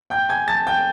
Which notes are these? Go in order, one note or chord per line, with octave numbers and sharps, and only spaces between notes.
G5 G6
G#5 G#6
A5 A6
G5 G6